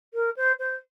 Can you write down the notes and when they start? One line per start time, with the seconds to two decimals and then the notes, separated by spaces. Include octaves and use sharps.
0.14 A#4
0.36 C5
0.59 C5